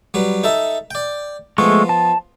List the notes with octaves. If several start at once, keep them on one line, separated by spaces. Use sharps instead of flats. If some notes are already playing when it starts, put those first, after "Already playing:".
F#3 G3 B4
D#4 A4 E5
D5 G5
F3 G#3 A3 B3 C#6
A5